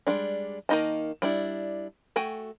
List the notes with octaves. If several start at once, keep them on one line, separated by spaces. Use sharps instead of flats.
G3 G#3 D4
D#3 A#3 D#4 D#5 A5
G3 D4 E4
A3 F#4 G5 G#5